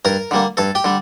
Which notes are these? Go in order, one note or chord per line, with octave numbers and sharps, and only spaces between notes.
G2 A#4 A#5
D3 G3 A#3
G2 A4 A5
G4 G5
D3 G3